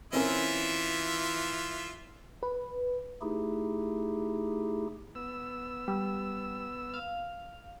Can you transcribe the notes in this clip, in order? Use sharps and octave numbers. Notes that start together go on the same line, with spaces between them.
E3 C4 C#4 F4 A#4 E5
B4
A3 D#4 E4 G4 G#4
B3 E6
G3
F5